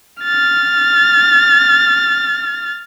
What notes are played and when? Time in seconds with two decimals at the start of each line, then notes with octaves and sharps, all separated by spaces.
0.23 F6 A6